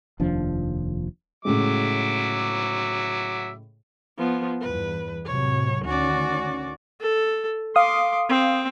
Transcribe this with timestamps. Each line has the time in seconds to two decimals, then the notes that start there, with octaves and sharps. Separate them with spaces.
0.20 F1 D#2 F3 D4
1.45 A2 C#3 F#3 G#3 E5 D6
4.18 F3 B3
4.61 E2 G2 B4
5.25 A2 C3 F#3 C#5
5.84 D2 D#3 C#4 F#4 D5
7.00 A4
7.76 F5 C6 D6 D#6
8.29 C4